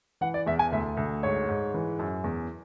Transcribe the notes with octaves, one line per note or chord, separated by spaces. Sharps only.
E3 F#5
D5
E2 E5
G#5
D2 E5
D2
G#2 C#5
G#2
E3
F#2
E2